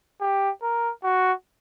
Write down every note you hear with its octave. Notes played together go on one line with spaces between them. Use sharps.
G4
A#4
F#4